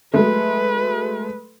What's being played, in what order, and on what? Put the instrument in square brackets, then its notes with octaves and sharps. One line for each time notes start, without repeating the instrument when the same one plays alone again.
[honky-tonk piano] F#3 G#3 A3 [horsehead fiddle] B4